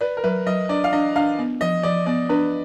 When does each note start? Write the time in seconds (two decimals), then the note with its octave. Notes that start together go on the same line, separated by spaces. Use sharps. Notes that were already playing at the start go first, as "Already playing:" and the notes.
0.01 B4 D5
0.17 A#4
0.24 F#3 B4
0.47 F#3 D#5
0.69 D4 D5
0.84 F5
0.93 D4 D#5
1.16 D4 F5
1.39 B3
1.61 F3 D#5
1.83 F3 D5
2.06 B3 D5
2.29 D4 B4